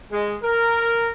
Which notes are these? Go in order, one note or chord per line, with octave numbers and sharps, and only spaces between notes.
G#3
A#4